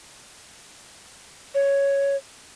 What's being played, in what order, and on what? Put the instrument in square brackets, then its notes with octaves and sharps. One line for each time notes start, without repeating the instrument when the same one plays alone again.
[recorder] C#5